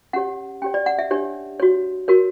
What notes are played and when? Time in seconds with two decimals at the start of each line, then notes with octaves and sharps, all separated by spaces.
0.13 C#4 G4 C#5 F#5
0.62 C#4 G4 C#5 G5
0.74 D5
0.86 F#5
0.99 E5
1.11 D4 G4 C#5
1.59 F#4 C#5
2.08 F#4 A#4 C#5